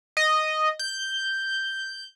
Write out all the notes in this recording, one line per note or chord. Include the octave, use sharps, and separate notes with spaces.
D#5
G6